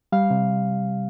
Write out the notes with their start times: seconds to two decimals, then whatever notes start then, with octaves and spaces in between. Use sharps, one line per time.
0.12 G3 F5
0.30 C3